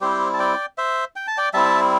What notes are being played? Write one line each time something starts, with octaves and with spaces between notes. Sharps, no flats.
G3 C4 E4 G4 C5
A5
D5 G5
C5 E5
G5
A5
D5 G5
G3 C4 E4 E5 A5